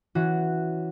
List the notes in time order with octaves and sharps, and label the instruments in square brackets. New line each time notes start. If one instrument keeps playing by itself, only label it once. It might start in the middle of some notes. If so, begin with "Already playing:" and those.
[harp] E3 C#4 F#4